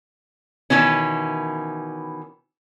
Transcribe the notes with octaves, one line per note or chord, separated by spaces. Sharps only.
B2 D#3 E3 C#4